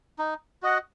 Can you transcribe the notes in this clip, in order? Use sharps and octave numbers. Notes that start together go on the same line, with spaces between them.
D#4
F#4 D#5 F#5